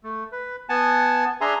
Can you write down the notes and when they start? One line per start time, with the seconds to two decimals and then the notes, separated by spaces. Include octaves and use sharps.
0.03 A3
0.32 B4
0.69 B3 F#5 G#5 A5
1.41 D4 G#4 E5 G#5 A#5 C6